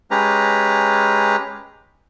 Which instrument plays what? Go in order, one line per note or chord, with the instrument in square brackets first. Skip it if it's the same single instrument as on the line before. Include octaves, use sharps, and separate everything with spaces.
[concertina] G#3 C#4 G4 B4 A#5